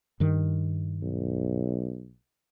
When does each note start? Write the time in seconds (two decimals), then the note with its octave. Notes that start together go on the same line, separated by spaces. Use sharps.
0.20 G2 D#3
1.02 B1